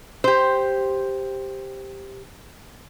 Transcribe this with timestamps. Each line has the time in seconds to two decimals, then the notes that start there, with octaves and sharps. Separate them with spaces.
0.24 G4 C5